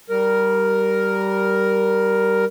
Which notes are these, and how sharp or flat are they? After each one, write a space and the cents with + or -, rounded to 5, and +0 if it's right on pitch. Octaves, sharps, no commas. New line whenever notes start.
G3 -15 A#4 +0